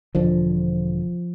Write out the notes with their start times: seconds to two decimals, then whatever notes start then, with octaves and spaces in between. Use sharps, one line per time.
0.15 E1 D3 F3